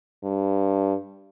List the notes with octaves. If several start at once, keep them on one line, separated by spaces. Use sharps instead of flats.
G2